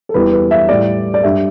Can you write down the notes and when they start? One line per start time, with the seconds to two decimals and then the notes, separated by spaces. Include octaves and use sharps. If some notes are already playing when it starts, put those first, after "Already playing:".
0.09 A4
0.14 E2 E3 G3 B4
0.32 B4
0.51 E5
0.69 A2 G3 D5
1.14 D5
1.23 G2 G3 E5